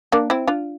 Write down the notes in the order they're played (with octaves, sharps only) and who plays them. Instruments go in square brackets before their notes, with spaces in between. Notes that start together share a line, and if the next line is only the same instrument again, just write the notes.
[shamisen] A#3 D4
C4 E4
D4 F4